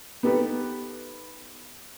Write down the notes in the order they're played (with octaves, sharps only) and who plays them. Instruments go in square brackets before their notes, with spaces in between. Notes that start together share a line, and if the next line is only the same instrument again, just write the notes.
[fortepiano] B3 D#4 G4 A4 B4